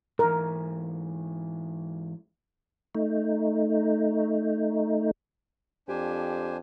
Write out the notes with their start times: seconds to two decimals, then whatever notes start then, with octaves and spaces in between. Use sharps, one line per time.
0.19 G#2 E3 A#4
2.95 A3 D#4
5.89 F2 D4 G4 C5 G#5